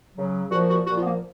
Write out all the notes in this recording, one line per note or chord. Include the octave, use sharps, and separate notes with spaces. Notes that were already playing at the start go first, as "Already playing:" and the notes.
C#3 F#3
A#2 F3 F#4
F#4
A#2 F3 F#4
F4
B3
A#3